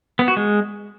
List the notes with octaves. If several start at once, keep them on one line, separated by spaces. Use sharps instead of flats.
B3
F#4
G#3